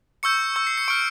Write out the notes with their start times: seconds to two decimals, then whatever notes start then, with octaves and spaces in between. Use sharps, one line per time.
0.23 C#6 E6 G6 C#7
0.56 C#6 E6 G6
0.67 C7
0.77 C#7
0.88 C#6 F6 D7